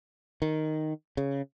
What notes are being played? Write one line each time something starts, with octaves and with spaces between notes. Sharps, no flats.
D#3
C#3